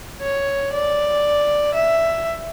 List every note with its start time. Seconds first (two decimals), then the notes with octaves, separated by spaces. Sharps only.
0.22 C#5
0.73 D5
1.75 E5